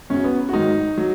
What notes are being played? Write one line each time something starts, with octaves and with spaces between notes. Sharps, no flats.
F#2 C#3 F#3 C#4
B3
F#4
G#2 D#3 F#3 D#4
F#3